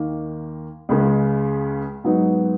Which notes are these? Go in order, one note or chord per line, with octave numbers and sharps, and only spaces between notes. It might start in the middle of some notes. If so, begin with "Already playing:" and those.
Already playing: D#2 D#3 A#3
C#2 C#3 G#3
G#2 F#3 B3 D#4